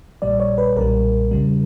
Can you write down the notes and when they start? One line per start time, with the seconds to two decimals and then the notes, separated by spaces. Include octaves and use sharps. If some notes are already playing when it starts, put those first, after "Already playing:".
0.22 A#1 A#2 G3 D5
0.40 C#5
0.58 B4
0.77 B1 A#2 G3 A#4
1.31 E2 C#3 G3